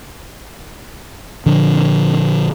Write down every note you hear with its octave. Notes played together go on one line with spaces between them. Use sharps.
A#2 D3 F3 D4